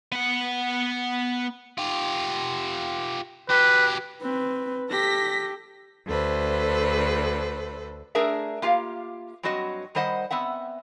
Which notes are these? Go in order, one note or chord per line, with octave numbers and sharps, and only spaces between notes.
B3 F#5
F4 G4
F#3 G4 B4
C4 B4
G4 A4 A#6 B6
D2 A4 B4 C5
A3 D4 G#4 A#4 D5 E5
A#3 F4 G4 F5
G2 F#3 C4 F#4 D#5
D#3 G3 C5 D#5 F#5
B3 C4 E5 F#5